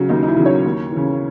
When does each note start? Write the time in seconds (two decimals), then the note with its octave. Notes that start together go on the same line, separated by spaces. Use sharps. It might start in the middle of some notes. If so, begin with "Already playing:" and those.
Already playing: C#3 F#3
0.09 D#2 D#4
0.23 D#4
0.28 E4
0.36 C#3 F#3
0.46 C#5
0.65 D#2
0.92 C#3 E3